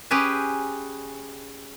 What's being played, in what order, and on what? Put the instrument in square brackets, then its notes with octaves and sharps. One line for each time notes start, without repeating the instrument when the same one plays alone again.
[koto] C#4 G4 G#4 B4